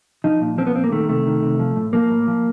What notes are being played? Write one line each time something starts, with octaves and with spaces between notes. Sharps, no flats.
F3 D#4
A#2
F3 C4
B3
A#2 C4
A#3
D#3 A3
C3 A3
D#3
C3
F3
A2
F3 A#3
A2
F3